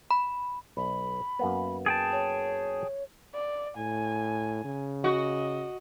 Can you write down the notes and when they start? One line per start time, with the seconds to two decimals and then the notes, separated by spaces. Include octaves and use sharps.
0.11 B5
0.77 B1 B5
1.39 F#2 A#3 B3
1.86 G#4 G5 A5
2.12 C#5
3.34 D5
3.77 A2 G#5
4.65 C#3
5.04 F#4 D#5